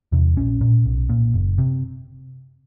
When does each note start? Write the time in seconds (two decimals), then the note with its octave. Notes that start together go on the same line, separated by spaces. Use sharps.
0.12 E2 C3
0.36 A#1 C#4
0.61 A#2
0.86 B1
1.09 A#2
1.34 F#1
1.58 C3